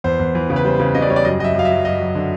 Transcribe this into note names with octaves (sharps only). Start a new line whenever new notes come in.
E2 C5
E2
E3
C#3
B4
G3 C5
C#3
C#3 D#5
D5
G3 C#5
D5
F#2 D#5
F#2 D#5
E5
F#2 F5
E5
F#3
F#2 D#5
F#3
D3